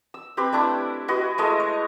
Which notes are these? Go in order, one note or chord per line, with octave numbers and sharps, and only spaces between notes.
E6
C4 G4 B4 B5
A3 D4 E4 A4
E4 F#4 B4 D#5
G#3 A3 E4 D#5
C#5